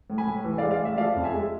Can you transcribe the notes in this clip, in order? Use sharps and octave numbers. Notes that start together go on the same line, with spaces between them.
A2
G#5 B5
A2
E3
D5 F5
G#3
D5 F5
A2
E5
F3 D5 F5
F2
E5 G#5
G#3